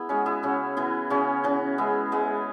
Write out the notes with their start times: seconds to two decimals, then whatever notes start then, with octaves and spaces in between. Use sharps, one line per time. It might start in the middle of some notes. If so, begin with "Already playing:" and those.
Already playing: B3 E4 G#4
0.09 G#3 C#4 F#4
0.26 E4 G#4
0.43 C#3 C#4 F#4
0.77 E3 B3 E4
1.10 C#3 C#4 F#4
1.44 E3 C#4 F#4
1.78 G#3 B3 E4
2.12 G#3 B3